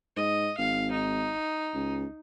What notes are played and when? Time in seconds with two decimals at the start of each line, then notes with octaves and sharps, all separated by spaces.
0.16 G#2 D#5
0.58 G#1 F5
0.91 D#4
1.74 C#2